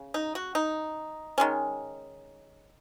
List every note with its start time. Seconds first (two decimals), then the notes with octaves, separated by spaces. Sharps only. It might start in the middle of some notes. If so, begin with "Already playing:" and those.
Already playing: C#3
0.14 D#4
0.35 F#4
0.55 D#4
1.38 D#3 G#3 C#4